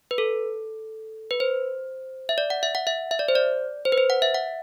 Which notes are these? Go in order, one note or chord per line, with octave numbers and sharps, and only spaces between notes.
B4
A4
B4
C5
E5
D5
F#5
E5
F#5
E5
E5
D5
C5
D5
C5
B4
C5
F#5
E5
F#5